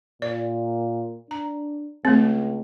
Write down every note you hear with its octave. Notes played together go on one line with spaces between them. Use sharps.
A#2 D5
D4 A#5
C#2 A3 C4